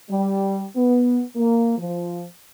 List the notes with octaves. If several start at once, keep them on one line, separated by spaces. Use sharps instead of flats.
G3
B3
A#3
F3